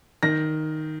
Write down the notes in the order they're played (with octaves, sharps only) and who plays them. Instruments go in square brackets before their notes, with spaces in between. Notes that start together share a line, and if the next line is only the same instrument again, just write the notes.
[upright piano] D#3 A#6